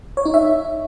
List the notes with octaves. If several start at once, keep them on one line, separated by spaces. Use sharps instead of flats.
C#5
D#4
E5